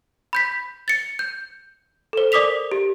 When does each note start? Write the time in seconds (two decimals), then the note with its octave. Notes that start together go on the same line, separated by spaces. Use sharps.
0.33 B5 G6 B6
0.88 A6 C#7
1.19 G6
2.13 A4 C5
2.32 A#4 D5 D6 D#6 B6 F7
2.72 G4